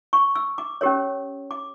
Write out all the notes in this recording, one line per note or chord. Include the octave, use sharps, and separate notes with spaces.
C#6
E6
D6
C#4 G4 A#4 C#5
D6